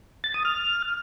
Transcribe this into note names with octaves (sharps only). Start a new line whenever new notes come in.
A6
D#6
F6